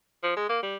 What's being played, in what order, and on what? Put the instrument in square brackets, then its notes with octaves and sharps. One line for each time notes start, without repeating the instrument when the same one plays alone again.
[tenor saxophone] F3
G#3
A#3
G3